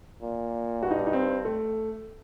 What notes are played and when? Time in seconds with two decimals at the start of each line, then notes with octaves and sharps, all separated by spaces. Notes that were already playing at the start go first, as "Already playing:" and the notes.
0.22 A#2
0.83 G2 F#4
0.91 D#4
0.98 D4
1.06 D#4
1.13 C4
1.45 A3